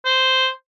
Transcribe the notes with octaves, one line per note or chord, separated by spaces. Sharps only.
C5